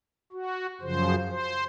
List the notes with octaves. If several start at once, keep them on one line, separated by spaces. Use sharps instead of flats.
F#4
F#2 C#3 F3 C5
C5